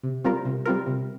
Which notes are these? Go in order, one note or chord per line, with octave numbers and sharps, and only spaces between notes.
C3
G3 C4 F4 A#4
C3
G3 C4 F4 A#4
C3